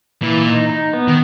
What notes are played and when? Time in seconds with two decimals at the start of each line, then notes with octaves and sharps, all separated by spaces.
0.22 A#2 E3
0.46 D#4
0.69 D#4
0.93 B3
1.08 D#3